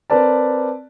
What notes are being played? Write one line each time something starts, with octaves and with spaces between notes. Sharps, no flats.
C4 A#4 B4 D5 A5